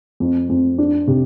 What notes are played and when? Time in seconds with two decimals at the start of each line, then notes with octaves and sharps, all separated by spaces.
0.20 F2
0.49 F2
0.78 D4
1.08 C3